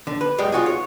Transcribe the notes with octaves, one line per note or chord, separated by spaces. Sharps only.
D3
B4
F#2 G3 G#3
F4 F#4 G#4
C#5